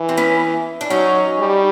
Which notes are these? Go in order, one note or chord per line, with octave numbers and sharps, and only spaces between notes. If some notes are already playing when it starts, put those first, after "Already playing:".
Already playing: E3
C4
B3 C#4
D4
F#3 C#4 D#4
G3